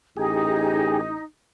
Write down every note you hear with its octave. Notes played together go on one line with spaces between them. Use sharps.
A1 D#4 G4 G#4